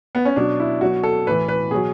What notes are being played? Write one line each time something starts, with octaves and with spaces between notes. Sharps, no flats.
B3
C#4
B2 F#3 D4
E4
B2 F#3 F#4
A4
A2 E3 B4
B4
B2 F#3 G#4